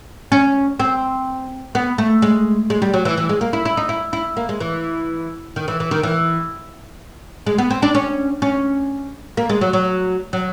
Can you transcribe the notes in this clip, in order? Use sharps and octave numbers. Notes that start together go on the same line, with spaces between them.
C#4
C4
B3
A3
G#3
G#3
G3
F#3
E3
E3
G#3
A#3
E4
E4
D#4
E4
E4
A#3
G#3
E3
D#3
E3
E3
D#3
E3
G#3
B3
C4
D4
C#4
C#4
A#3
G#3
F#3
F#3
F#3